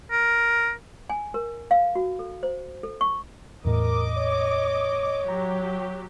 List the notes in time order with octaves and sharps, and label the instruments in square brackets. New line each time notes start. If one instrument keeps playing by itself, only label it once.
[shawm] A#4
[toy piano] G#5
A#4
F5
F#4
A4
C5
A4
C#6
[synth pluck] E2 A2 [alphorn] A#4 [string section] D#5 D6
[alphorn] C#5
[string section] F#3 G4 [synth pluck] A#5